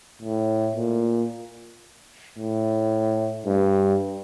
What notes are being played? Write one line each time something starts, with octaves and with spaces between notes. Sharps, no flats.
A2
A#2
A2
G2